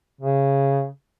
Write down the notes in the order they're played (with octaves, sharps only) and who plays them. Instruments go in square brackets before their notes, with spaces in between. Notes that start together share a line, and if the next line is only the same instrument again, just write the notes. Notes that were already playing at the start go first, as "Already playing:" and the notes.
[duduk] C#3